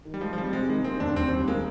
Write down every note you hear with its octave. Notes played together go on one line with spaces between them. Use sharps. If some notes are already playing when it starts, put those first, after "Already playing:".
D#3
G3
F3 G#3
F3
G3 C4
C3 G#3
D#3 G#3
A#3 C4
D#2 D4
D#2 C4
G3
G#3 A#3